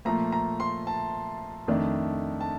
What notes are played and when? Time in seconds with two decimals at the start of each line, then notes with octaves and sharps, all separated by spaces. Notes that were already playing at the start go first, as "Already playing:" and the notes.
0.05 A#2 F3 A3 A#5
0.32 A#5
0.60 C6
0.87 A5
1.68 F2 D#3 A3 D4
2.41 A5